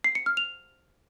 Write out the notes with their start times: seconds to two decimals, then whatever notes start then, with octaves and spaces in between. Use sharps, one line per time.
0.04 C7
0.15 C#7
0.26 F6
0.37 F7